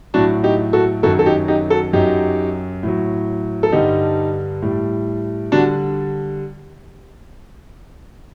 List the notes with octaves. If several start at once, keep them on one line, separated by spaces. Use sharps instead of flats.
A2 F#3 D4 F#4
D#4 G4
F#4 A4
F#2 D#3 F#3 F#4 A4
A4
D#4 G4
D#4 G4
F#4 A4
F#2 F#3 D#4 G4
A2 F#3
A4
G2 D3 G3 D#4 G4
A2 G3
D3 G3 D4 F#4